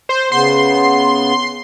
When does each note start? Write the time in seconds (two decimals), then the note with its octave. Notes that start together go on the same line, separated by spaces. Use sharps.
0.09 C5
0.32 C#3 B3 C6